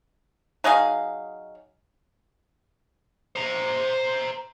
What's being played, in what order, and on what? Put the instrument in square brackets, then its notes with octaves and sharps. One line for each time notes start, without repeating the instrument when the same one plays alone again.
[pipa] F#3 D#4 G#4 F5
[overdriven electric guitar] C5 A#5